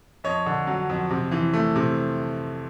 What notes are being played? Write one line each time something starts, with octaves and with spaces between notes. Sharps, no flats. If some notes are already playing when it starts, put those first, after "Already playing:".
F2 C#5 D#5
D3
F#3
F2
C3
E3
A3
C3